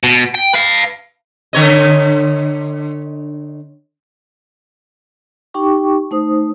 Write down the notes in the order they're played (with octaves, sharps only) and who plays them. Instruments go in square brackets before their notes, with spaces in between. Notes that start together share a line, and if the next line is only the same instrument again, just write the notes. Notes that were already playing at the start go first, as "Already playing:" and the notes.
[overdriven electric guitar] B2
G5
B4 F5
[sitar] D3 C#5 D#5
[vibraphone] D#4 G4 G5 C#6 D6
A3 D#4 C5 D#6